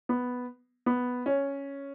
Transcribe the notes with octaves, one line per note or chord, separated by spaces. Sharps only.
B3
B3
C#4